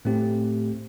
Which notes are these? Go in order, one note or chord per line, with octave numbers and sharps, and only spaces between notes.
A2 A3 C4 G4